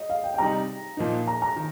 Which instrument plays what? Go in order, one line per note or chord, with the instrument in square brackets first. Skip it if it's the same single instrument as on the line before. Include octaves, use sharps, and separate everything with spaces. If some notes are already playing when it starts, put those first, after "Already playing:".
Already playing: [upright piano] D#5
F5
G5
G5
[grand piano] C3 G3 D#4 [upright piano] A#5
[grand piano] A#2 F3 A#3 D#4
[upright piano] A#5
A#5
[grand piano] D#3